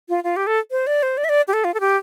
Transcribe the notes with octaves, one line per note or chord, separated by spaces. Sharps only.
F4
F4
G4
A4
C5
D5
C5
D5
E5
D5
G4
A4
F4
A4
G4